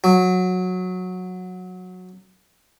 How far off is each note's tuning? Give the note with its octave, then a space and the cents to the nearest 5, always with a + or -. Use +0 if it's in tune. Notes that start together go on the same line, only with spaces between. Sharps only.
F#3 -15